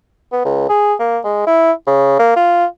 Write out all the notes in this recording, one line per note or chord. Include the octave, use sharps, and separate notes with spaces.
B3
C#2
G#4
A#3
G#3
E4
C#3
A#3
F4